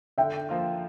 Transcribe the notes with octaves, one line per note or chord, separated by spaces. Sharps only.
D3 E5 G5
F3 A#3 F4